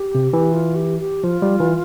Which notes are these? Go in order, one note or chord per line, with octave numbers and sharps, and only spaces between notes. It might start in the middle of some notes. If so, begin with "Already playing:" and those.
Already playing: G4
C3
E3
F4
G4
G4
F3 F4
G3
E3